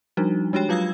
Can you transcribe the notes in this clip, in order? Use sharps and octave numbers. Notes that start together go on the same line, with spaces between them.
F3 G3 D4 D#4 F#4
G#3 D4 F#4 G4 C#5 G5
F#3 F4 F5 D#6 E6 G#6